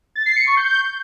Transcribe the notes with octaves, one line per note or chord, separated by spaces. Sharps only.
A6
C7
C#7
C#6
G6